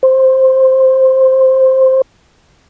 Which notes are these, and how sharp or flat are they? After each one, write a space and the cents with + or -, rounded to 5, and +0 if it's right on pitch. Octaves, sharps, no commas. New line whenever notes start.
C5 +5